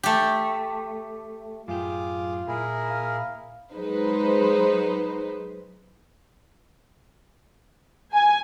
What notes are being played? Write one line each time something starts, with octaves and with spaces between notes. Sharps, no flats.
A3 G4
F#2 A2 F4 G4 G#4 D6
A#2 E4 G#4 A#4
F5
F#3 G#3 D#4 B4 C5
G#5